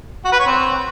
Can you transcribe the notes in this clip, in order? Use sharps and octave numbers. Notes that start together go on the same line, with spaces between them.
F#4
B4
C#5
C4